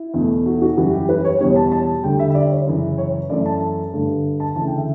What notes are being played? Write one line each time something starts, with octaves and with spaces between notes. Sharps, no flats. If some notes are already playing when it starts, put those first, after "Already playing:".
Already playing: E4
E2 B2 A3
F#4
F#4
F#2 E3 G3 F#4
G4
B4
C#5
E2 B2 G3 C#5
A5
A5
D2 D3 G3 G5
E5
E5
D5
C#5
F#2 C#3 E3
C#5
F#2 E3 A3 D5
A5
A5
G2 D3 A3
A5
D2 C#3 E3 A5
G5
E5